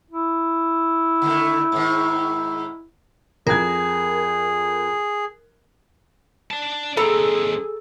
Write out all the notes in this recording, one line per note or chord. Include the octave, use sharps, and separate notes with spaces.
E4
D3 D#3 A3
G#2 D#3
F2 G#4 A#4 G#6
D5 A5
D#2 C4 G#4 A4 A#5